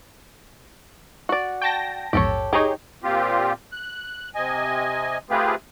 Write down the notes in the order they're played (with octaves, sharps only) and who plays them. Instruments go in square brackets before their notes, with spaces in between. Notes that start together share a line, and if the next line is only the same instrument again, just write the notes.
[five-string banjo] F#4 D5
[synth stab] G5 A5 A#6 [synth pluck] C#6
[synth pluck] A#1 E2 G#2 [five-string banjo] G4 A4 C#5
[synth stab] D#4 G#4 [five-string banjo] G4 C#5
[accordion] A#2 C4 F4 G4
F#6
C3 D#5 G#5
A3 C4 F4 G4 G#4 B4